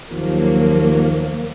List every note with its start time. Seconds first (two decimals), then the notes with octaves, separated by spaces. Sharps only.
0.11 D#2 F3 F#3 A#3